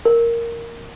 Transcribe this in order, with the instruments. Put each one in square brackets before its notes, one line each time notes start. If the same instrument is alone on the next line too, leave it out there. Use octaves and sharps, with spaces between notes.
[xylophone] A#4